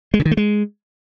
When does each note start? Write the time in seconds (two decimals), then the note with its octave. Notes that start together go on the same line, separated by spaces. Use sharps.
0.14 G#3
0.20 C#3
0.25 D#3
0.31 A3
0.37 G#3